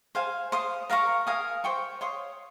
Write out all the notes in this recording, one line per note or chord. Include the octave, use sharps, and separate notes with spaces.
C5 F5 G#5
C5 F5 C6 D#6
A#4 F5 A#5 C#6
A#4 F5 G#5 D#6
C5 G5 C#6
C#5 F5 C6 D#6